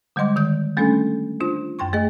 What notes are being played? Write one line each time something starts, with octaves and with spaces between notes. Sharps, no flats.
D3 G3 G#3 D#5 C6 D6
D#3 G6
G3 A3 C#4 D4 A4
D4 F4 C5
F#2 G5 C6 C#6
A3 G#4 D#5